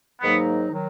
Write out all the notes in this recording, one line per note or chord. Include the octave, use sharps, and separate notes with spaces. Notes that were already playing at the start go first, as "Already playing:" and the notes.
G#2 D#3 F#3 A#3 B3 D#4
D#3 F#3